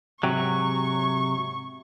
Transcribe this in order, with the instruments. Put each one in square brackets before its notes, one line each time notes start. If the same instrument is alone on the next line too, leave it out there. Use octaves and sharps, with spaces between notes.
[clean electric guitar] G#2 C3 F#3 [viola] C#6